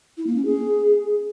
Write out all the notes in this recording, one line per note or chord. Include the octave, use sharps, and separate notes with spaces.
E4
A#3
C#4
G#4